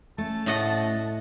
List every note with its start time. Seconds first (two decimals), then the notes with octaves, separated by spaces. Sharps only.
0.18 A3 C#4 A5
0.46 A2 D#5 F#5